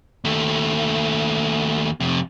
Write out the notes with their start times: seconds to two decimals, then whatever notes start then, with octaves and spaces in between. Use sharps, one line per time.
0.24 D#2 A3
2.00 F2 C3